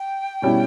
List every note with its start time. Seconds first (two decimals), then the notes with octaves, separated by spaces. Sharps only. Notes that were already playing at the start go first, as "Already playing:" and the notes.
Already playing: G5
0.42 B2 G3 C#4 E4